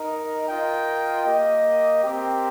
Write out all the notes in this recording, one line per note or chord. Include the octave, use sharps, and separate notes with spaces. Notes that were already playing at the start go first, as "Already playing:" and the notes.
Already playing: D#4 A#4 D#5
F4 A#4 D#5 G5
A#3 G4 D#5
C4 G4 A#4 G5